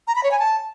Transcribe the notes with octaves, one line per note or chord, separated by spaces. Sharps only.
A#5
B5
C#5
G#5
A5